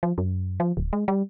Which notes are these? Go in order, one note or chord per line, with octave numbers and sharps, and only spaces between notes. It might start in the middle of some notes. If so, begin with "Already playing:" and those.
F3
F#2
F3
D1
G#3
G3